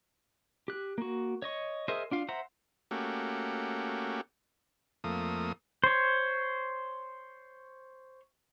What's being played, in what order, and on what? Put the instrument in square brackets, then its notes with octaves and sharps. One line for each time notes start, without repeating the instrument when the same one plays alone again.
[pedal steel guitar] G4 F#6
A#3 F#4
C#5 D#5 C#6
G#4 A#4 C5 D#5 E5
D4 F4 F5
C5 E5 F#5 A#5
[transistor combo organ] A3 A#3 C#4 F#4 G4
F2 A3 A#3 D#6
[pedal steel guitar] C5 C#5